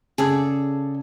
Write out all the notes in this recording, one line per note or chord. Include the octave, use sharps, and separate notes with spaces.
C#3 G#4 A4 D5